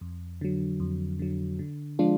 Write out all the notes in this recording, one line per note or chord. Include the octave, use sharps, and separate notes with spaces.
F2
D3 F#3
F2
D3 F#3
D3
F3 G#3 D4 F4